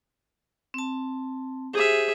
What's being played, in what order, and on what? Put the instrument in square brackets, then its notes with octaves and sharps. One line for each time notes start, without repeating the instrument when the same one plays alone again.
[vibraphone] C4 A5
[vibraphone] G4 C5 [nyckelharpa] G#4 E5